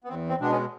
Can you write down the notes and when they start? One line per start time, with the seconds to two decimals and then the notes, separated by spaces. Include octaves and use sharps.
0.04 B3
0.08 E2 C4
0.29 C4
0.40 B2 G#3 B3 D4
0.50 B3 C#4